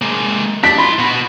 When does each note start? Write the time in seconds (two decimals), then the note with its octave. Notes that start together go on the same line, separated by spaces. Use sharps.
0.02 G#3 A#3
0.64 D4 B6
0.78 E4 B5 C6
0.99 B2 F#4